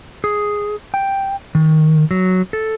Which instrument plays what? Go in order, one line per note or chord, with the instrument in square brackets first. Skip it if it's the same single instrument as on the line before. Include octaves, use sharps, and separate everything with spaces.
[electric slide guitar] G#4
G5
D#3
F#3
A4